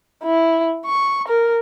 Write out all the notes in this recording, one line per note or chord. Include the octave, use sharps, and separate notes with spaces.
E4
C#6
A#4